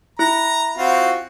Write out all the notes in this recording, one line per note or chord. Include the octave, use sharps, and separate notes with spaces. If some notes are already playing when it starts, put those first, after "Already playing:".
E4 A#5
C4 F4 F#4